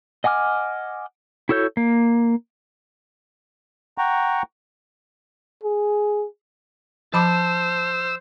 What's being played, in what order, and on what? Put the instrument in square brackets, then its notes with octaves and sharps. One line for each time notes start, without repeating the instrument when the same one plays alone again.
[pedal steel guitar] D#5 F#5 G#5 D6 F6
E4 F#4 A4 C#5 G6
A#3
[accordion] F#5 G5 A#5 C#6
[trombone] G#4
[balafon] F3 B5 D6 [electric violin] C5 [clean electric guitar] A5 [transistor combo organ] E6